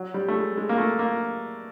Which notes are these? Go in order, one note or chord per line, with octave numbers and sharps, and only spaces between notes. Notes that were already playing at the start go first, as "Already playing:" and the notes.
Already playing: F#3
G3
A3
G#3
G#3
A#3
A3
A#3